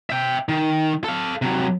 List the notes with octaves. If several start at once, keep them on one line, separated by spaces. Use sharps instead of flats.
E5 G5
D#3
A4 F5
C3 F#3